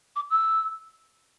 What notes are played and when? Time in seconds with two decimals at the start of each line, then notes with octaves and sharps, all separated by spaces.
0.15 D6
0.30 E6